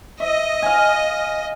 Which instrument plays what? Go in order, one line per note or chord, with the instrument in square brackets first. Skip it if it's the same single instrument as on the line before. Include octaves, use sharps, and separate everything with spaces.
[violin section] D#5 [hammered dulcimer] E5
[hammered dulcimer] F5 G#5